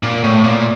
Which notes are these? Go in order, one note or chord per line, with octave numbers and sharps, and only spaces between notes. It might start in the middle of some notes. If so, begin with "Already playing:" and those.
A#2
A2
A#2